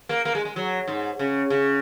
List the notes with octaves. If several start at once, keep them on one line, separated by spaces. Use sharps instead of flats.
A#3
A#3
G#3
G#3
F#3
G#2
C#3
C#3